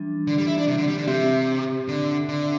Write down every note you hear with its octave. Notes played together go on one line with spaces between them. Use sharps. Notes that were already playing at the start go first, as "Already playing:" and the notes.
Already playing: E3 G3 D4
D3
G3
E4
D4
C3
D3
G3
D3
C3 C4 G4 E5
D3
D3